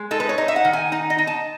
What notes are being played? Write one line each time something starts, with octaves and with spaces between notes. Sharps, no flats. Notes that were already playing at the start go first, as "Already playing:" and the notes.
Already playing: G#3
D#4 A4
B4
C#5
D#4 D#5
E5
F#5
D#3
G#5
D#4 F#5
D#5
D#4
A5